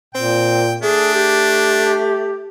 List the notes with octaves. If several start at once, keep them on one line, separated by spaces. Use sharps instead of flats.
A#2 C4 G5
A3 D4 G#4
G4